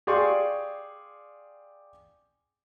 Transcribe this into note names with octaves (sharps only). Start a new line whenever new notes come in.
G4 G#4 D5 F5 C6 C#6